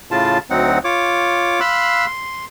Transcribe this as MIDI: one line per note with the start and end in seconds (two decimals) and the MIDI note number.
0.11 0.38 45
0.11 0.38 49
0.11 0.38 65
0.11 0.38 81
0.50 0.79 38
0.50 0.79 54
0.50 0.79 60
0.50 0.79 63
0.50 0.79 78
0.84 1.60 65
0.84 1.60 73
0.84 1.60 86
1.60 2.06 77
1.60 2.06 83
1.60 2.06 84
1.60 2.06 88
1.60 2.06 90
2.06 2.45 84